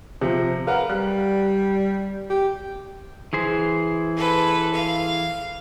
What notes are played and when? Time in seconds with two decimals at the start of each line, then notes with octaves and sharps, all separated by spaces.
0.21 C3 F3
0.67 A#4 B4 F5 F#5
0.90 G3 F#6
2.30 G4
3.33 E3 G#4 C5
4.16 A4 B4
4.74 F5